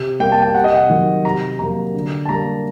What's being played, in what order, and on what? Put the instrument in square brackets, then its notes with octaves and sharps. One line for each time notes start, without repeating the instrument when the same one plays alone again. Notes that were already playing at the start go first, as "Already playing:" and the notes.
Already playing: [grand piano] C3
G3 A#3 G5
A5
G5
C3 F#5
D#5
F#5
D#3 F#3
C3 A#5
F#3 A#3 A#5
D3
A5
G3 A#3 A#5